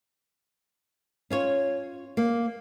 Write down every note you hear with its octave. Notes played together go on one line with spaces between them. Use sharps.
C#4 F4 C#5
A#3